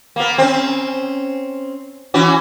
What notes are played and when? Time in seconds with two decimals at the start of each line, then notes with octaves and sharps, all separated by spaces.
0.16 A#3 B3
0.38 C4 C#4
2.14 E3 C#4 F#4